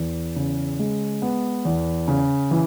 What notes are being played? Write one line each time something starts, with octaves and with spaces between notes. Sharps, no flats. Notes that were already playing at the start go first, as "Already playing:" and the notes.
Already playing: E2
C#3
G#3
B3
E2
C#3
E3